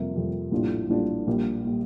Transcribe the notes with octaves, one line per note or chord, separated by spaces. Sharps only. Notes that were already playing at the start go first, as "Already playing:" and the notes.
Already playing: F2 C3 G3 A#3
F2 C3 G3 A#3
A#1 A2 G3 D4 F4
A#1 A2 G3 D4 F4
A#1 A#2 G3
A#2 G3